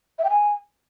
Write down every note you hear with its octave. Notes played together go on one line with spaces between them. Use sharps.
E5
G5
G#5